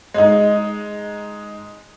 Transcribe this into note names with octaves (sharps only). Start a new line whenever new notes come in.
G#3 D#4